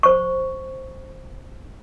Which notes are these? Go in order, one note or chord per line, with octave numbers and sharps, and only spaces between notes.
C5 C#6